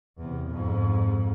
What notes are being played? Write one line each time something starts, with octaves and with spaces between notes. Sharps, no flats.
E2 C3
F2 G#2